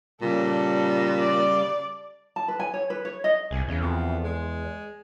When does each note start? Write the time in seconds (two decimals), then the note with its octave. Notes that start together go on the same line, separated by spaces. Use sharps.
0.22 A#2 C#3 G3 A4
1.19 D5
2.36 A5
2.48 B4
2.60 G#5
2.74 C#5
2.90 B4
3.05 C#5
3.24 D#5
3.51 C2 G#4
3.68 E2 C#3
3.81 F2
4.24 G#3